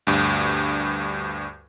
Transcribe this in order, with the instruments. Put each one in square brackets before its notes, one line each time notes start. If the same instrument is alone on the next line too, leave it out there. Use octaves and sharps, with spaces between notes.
[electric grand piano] D2 G2